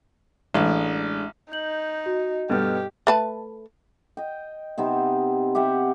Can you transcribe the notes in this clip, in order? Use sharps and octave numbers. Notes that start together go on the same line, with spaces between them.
A1 G#3 A3 D4
D#4 G6 F#7
F#4
G2 B2 B3 G4 A4 F6
A3 B4 A5
D#5 G5
C3 B3 C4 D#4
G4 E5 F#5 G5